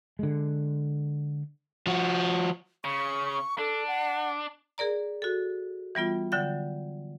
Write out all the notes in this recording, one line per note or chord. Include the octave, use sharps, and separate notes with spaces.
D3 G#3
F3 F#4
C#3 C#6
D4 A4
F#5
G#4 A#4 D5 A#5
F#4 A4
E3 G3 B3 F4
D3 F#3 G5 G6